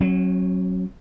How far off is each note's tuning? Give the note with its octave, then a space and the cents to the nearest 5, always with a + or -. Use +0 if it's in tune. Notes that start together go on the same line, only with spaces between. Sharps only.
F#3 +5 C#4 -35